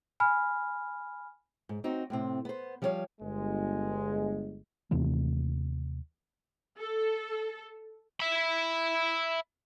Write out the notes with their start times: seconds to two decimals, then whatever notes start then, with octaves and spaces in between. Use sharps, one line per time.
0.20 G#5 B5 F6
1.69 G#2
1.84 C4 D#4 F#4
2.10 A2 C3 C4
2.45 B3 C5
2.82 F3 G3 F#4 C5 C#5 F5
3.21 G1 G#3
4.91 D#2 C3 E3 A3
6.79 A4
8.20 E5 B5